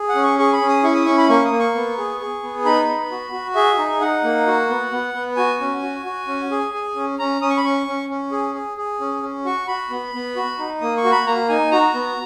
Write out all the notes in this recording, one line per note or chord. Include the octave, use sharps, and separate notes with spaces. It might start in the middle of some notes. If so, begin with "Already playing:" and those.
Already playing: G#4
F#5
C#4
C#6
G#4 C#6
B5
C#4
D#6
E4 C#6
D#6
C#4 C#6
B5
A#3 C#6
D#6
A#3
C#6
B3
G#4
G#4
B3
D#4 B5
B3
F#4
F#4
G#4 E5
D#4
D#4 F#5
A#3
F#4
B3
B3
B3
F#4 G#5
C#4
F#4
F#4
C#4
G#4
G#4
C#4
C#4 A#5
C#4 D#6
C#6
B5
C#4 C#6
C#4
C#4
G#4
G#4
G#4
C#4
C#4
F#4 C#6
F#4 B5
B3
B3
F#4
D#4
A#3 D#6
C#6
F#4
B5
A#3 A#5
D#4 G#5
F#4 A#5
B3